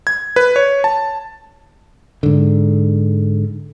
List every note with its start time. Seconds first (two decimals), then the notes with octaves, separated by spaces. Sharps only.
0.07 G#6
0.36 B4
0.56 C#5
0.84 A5
2.23 G#2 D3